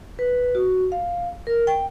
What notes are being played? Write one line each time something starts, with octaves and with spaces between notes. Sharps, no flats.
B4
F#4
F5
A#4
G5